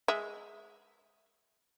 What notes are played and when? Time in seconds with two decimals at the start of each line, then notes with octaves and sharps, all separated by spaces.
0.08 G#3 E5